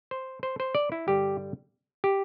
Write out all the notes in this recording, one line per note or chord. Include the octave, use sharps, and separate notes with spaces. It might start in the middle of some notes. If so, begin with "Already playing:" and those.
C5
C5
C5
D5
E4
G2 D3 G3 G4
G4